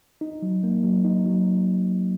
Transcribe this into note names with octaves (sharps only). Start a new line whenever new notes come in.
D#4
F#3
A#3
F#3
D#4
F#3